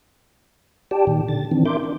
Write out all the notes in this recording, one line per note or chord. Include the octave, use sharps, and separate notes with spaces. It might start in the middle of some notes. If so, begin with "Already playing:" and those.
G4 D5 G5 A5
A#2 D#3
D3 A6
D#3 E3 C4 D4
D4 A#4 E5 C6 D6 G6
D4